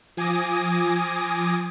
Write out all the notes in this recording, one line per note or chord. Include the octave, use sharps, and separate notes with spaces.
F3 G#5 D6 D#6 A#6